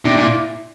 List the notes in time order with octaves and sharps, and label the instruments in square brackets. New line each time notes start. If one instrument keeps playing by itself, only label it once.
[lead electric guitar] C3 [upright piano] D4
[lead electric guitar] A#2
[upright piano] E4